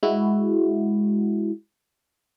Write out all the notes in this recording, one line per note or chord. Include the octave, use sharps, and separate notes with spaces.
G#3 E4 F#4